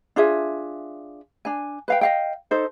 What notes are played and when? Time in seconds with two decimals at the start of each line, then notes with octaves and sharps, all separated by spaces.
0.16 D4 F4 G#4 E5
1.45 D4 G#5
1.88 B4 F5 G5
2.01 D#5 F5 G5
2.51 D#4 A4 C5